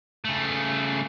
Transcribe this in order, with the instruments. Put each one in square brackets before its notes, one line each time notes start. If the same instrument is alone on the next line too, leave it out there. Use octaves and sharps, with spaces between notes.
[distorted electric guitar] C#3 A3